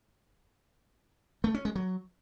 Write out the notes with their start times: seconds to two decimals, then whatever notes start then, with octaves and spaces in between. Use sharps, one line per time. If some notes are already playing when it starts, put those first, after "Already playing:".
1.44 A3
1.54 C#4
1.65 G#3
1.75 F#3